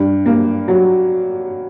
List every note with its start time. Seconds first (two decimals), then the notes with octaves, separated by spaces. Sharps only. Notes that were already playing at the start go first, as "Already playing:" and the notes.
Already playing: G2
0.26 A#3
0.68 F#3